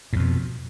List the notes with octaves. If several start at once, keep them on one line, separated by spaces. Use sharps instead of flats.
F2 G#2 B2